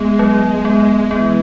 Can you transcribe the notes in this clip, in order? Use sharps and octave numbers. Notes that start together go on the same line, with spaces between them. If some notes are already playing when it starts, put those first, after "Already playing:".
Already playing: G#3 B3
F#3
B3
E3 B3